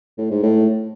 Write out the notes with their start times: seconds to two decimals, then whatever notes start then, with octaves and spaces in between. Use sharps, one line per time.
0.17 A2
0.30 G#2
0.43 A2